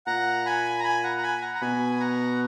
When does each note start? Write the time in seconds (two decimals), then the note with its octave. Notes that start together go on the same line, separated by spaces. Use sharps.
0.07 A#2 F#5 A#5
0.46 G#5 B5
0.79 A#5
0.84 G#5 B5
1.04 F#5 A#5
1.18 A#5
1.22 G#5 B5
1.42 F#5 A#5
1.55 A#5
1.61 B2 G#5 B5
2.00 F#5 A#5